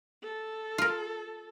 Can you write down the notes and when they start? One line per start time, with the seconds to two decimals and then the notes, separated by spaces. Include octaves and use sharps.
0.23 A4
0.78 F4 A#4